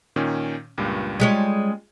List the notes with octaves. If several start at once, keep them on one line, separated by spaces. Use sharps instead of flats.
A#2 D#3 C#4
C#2 G2 A#2
G3 G#3 C#4 F4 G#4